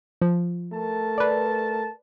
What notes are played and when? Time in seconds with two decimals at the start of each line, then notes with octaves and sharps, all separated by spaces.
0.22 F3
0.73 A3 A#4 A5
1.18 B4 D5